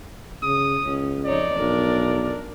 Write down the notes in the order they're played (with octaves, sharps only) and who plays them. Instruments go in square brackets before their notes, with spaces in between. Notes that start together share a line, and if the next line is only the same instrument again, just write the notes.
[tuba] C#3 [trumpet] D#6
[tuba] C#2 [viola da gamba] C#4
[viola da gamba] F2 D#4 C#5 [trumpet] D5
[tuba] B1 [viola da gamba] D4 A#4